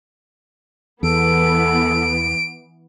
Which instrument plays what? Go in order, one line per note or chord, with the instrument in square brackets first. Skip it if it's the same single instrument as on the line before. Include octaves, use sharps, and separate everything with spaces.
[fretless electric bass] E2 [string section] E3 B3 [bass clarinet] A4 [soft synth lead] D7